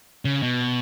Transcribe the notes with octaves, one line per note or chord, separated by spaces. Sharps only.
C#3
B2